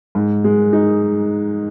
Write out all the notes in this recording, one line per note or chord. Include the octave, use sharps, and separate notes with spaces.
G#2
G#3
D#4